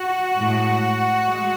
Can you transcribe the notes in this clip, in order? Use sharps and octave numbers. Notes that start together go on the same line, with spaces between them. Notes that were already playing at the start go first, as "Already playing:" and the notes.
Already playing: F#4
A2 G#3
G#3